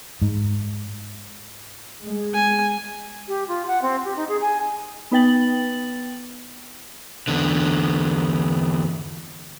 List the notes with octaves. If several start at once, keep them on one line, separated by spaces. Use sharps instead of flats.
G#2
G#3
G#5
G4
F4
F#5
C4
G4
D#4
G#4
G#5
B3 D#4 B4 G5 A6 F#7
E2 D3